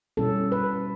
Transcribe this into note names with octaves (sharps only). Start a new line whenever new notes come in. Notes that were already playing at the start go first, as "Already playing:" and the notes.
B2 G3 C#4 E4 A4
B4